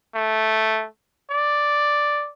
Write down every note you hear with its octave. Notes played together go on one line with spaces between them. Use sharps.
A3
D5